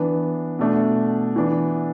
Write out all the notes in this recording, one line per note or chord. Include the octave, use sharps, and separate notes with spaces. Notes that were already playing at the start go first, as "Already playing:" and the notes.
Already playing: E3 B3 D4
B2 A3 D4
E3 B3 D4